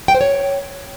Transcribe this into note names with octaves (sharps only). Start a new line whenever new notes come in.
G5
C5
C#5